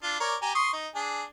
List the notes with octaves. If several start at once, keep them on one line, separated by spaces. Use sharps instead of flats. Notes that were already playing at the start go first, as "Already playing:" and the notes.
D4 F4
A#4 C#5 D5
G4 G#5 A#5
C6 C#6 D#6
D#4
D4 G#4